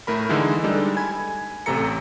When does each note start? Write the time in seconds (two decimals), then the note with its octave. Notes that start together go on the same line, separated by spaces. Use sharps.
0.07 A2 A3 A#4 B5
0.29 D3 E3 G#3 D#4 E4
0.63 G3 G#3 D4 D#4 A4
0.97 G#5 B5 G#6
1.66 A1 C3 A3 A4 A#5 C#7